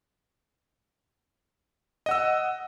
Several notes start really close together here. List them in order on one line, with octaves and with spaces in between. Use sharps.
D#5 F#5 E6